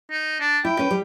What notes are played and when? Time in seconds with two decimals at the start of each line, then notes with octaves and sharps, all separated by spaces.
0.11 D#4
0.40 D4
0.65 E4 G5
0.79 C#4 B4
0.91 G3